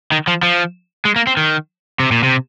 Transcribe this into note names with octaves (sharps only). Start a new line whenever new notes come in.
D#3
F3
F3
G#3
A#3
C4
D#3
C3
A#2
C3